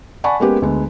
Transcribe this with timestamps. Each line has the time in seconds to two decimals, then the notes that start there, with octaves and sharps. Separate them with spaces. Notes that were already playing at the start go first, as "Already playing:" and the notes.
0.24 D5 F#5 G#5 A5 B5 C#6
0.40 G#3 A#3 B3 C#4 G4 B4
0.62 D2 G#3 B3